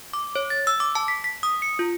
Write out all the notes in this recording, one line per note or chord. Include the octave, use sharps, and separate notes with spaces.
D6
C#5
A6
E6
D6
A5
B6
B6
D#6
C#7
F4